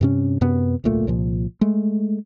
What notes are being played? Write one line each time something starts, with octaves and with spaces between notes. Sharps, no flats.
G2 C3 C#4
F#2 C3 B3
D1 B1 A#2 A3
C2 A#2 F3
G#3 A3